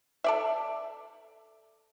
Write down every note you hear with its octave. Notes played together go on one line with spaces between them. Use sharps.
A4 D5 E5